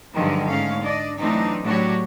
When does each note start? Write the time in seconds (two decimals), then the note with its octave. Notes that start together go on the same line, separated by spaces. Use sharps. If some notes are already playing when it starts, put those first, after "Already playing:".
0.12 G2 D3 D#3 F3 F#3 G#3
0.45 G#2 A3 C#4 F5
0.80 D4 D5 D#5
1.17 E3 F#3 A3 C4 D4 D#4
1.63 A2 F#3 D4 F#4 G4 C#5